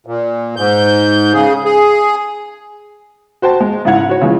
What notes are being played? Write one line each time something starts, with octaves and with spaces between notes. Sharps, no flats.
A#2
G#2 G6
C#3 G#4
G#4
F#4 C5 G5 A5
G#3
G#2 C#3 E4 F#5 G#6 F7
F#4 C#5
C#3 E3 F3 G#3